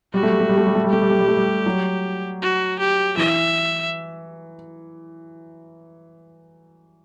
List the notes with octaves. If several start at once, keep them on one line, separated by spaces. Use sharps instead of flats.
G3 F#4
A3
G3
A3
G3
A3
G3
A3
G3
A3 G4
G3
A3
G3
A3
G3
F#3
F#4
G4
E3 E5